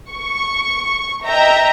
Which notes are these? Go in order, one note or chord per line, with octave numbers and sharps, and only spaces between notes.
C#6
D#5 E5 G5 A#5